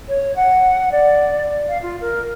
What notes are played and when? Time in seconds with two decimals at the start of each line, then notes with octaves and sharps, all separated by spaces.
0.09 C#5
0.36 F#5
0.91 D5
1.69 F5
1.82 F4
2.01 A#4